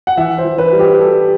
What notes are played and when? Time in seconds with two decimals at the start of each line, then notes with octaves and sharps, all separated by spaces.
0.07 F#5
0.17 E3 E5
0.38 C5
0.44 E3
0.58 B4
0.73 G3
0.79 G4
0.99 G3 A4